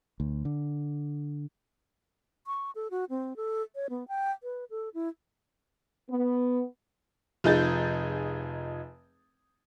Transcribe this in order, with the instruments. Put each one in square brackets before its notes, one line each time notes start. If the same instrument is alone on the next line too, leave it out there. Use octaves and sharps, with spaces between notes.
[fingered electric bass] D2
D3
[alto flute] C#6
A4
F#4
C4
A4
C#5
B3
G5
B4
A4
E4
[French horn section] B3
[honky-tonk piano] F1 F3 D#4 G#4 G6 A6